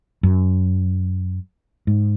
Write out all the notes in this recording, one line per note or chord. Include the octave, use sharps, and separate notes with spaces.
F#2
G#2